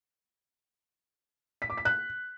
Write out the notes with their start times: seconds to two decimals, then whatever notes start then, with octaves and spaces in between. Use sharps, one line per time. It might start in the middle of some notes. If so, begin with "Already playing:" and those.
1.62 B6
1.70 D6
1.77 B6
1.85 F#6